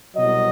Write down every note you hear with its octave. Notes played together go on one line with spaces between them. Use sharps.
C2 B2 F#3 D#5